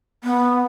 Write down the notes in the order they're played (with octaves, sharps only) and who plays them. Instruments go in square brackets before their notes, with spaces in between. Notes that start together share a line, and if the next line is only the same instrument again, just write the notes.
[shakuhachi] B3